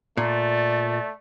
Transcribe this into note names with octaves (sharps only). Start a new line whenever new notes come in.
A#2 A3 D5